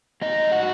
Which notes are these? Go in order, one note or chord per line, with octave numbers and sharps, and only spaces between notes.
G#2 F#3 A3 D#4 D#5
F#4 F#5